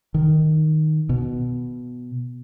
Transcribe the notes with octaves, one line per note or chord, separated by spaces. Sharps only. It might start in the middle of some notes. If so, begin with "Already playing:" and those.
D#3
B2